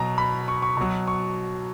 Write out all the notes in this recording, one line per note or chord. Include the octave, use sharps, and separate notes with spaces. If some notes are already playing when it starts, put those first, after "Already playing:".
Already playing: B2 F#3 A#5
B5
C#6
C#6
B2 F#3
C#6